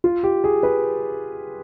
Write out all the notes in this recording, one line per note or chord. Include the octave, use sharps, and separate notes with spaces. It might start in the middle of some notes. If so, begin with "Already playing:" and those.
F4
G4
G#4
B4